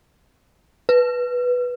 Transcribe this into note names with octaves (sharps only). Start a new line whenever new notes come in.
B4